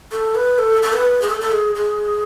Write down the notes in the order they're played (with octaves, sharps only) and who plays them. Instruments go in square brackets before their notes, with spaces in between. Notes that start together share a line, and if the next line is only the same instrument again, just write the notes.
[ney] A4
B4
A4
A4
B4
G#4
A4
A4
G#4
G#4